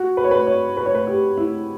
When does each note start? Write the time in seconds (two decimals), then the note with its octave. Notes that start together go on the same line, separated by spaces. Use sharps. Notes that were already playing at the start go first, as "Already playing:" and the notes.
Already playing: F#4
0.17 B4
0.24 C#5
0.31 B4
0.47 C#5
0.77 B4
0.86 C#5
0.95 B4
1.07 G4
1.37 E4